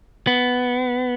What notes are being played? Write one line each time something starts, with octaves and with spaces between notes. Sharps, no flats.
B3